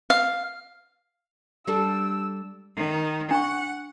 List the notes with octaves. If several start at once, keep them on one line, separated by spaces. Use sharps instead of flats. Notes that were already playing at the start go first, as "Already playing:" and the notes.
F5
G3 D4 A4 E6
D#3
D4 F#5 C#6